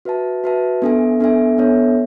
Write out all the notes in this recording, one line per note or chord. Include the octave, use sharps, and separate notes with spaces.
F#4 B4 E5 A5
F#4 B4 E5 A5
B3 D4 A4 E5 G#5
B3 D4 A4 E5 G#5
B3 D4 A4 C#5 E5